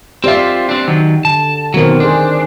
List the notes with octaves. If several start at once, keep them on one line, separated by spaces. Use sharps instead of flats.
C4 F4 G4 D5 E5
C4 D4
D#3 F#3
D3 A5
B2 D#3 F#3 C4 A#4
D4 G#4 C5